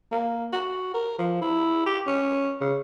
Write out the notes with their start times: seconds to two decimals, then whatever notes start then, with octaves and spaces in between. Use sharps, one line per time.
0.12 A#3
0.52 F#4
0.94 A#4
1.18 F3
1.42 E4
1.86 G4
2.07 C#4
2.61 C#3